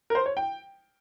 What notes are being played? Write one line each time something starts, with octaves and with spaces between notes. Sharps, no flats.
A#4
C5
C#5
G5